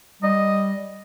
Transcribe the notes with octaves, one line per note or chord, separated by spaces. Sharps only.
G3 D#5